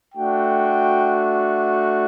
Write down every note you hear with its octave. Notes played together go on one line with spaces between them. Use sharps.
A3 D4 F#4 G5